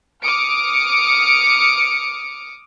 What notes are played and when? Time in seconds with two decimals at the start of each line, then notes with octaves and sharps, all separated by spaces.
0.23 D6 D#6 F6 C#7 D7